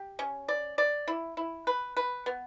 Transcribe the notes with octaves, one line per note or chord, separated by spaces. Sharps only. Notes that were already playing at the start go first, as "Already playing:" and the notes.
Already playing: G4
C#4
D5
D5
E4
E4
B4
B4
B3